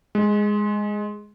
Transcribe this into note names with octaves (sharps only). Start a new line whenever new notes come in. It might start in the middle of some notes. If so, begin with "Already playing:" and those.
G#3